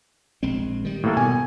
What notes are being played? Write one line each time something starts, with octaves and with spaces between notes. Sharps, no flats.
A#1 G#3 C4
D#3 G3
A2 A#3 A4
B2 G#5